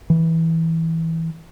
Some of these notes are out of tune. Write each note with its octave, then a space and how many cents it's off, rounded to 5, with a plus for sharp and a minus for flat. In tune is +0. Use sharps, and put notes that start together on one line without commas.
E3 -15